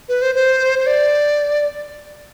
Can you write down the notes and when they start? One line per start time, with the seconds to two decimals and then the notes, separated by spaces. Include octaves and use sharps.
0.09 B4
0.22 C5
0.35 C5
0.79 C5
0.86 D5